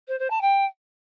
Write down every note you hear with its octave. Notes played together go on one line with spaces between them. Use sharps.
C5
C5
A5
G5